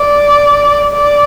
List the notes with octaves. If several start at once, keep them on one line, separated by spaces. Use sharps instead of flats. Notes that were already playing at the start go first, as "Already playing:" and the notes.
Already playing: D5
D5